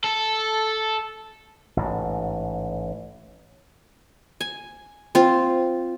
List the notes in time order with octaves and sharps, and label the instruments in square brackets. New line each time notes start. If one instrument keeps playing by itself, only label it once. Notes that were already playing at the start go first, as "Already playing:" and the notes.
[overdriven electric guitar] A4
[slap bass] A1 G#2
[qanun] G#5
C4 F4